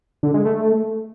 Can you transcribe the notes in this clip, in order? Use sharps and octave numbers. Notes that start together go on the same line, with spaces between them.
D3
G#3
A3